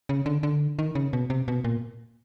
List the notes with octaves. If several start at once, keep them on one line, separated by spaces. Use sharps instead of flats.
C#3
D3
D3
D#3
C#3
B2
C3
B2
A#2